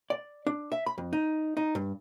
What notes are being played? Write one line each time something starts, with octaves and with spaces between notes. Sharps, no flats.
D5
D4
E5
B5
F2
D#4
D#4
G2